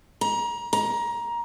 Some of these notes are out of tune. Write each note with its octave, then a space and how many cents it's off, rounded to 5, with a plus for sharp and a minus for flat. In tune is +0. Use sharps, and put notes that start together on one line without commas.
A#5 +30
A#5 +20